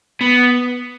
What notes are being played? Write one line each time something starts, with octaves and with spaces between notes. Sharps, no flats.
B3